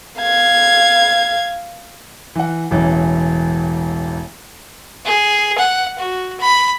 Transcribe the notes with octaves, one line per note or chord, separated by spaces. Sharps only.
F5 G#6
E3 F#5
E1 A1 E3
G#4
F#5
F#4
B5